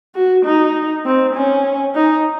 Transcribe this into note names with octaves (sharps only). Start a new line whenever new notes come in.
F#4
D#4
C4
C#4
D#4